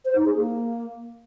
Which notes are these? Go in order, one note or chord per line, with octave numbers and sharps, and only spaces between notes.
C5
D#4
G#4
A#3